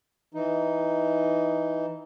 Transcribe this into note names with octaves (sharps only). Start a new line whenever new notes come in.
E3 D#4